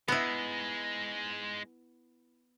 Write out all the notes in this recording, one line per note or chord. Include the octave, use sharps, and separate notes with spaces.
G#3 B3 D#4 E4